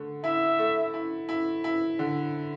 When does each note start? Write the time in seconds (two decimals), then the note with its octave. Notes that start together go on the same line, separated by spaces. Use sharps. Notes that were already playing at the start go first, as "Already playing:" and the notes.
Already playing: D3 A3
0.23 E4 E5
0.58 A3
0.94 E4
1.29 E4
1.64 E4
1.99 D3